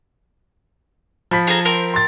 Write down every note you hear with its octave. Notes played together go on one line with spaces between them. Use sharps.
F3 B5 B6
G#4 A4 A#5
C4 A#4
C6 A6